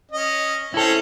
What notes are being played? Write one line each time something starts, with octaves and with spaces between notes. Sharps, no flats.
C#4 D#5
C4 C#4 E4 A4